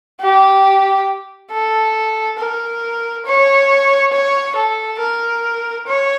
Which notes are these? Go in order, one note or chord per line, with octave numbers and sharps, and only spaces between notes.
G4
A4
A#4
C#5
C#5
A4
A#4
C#5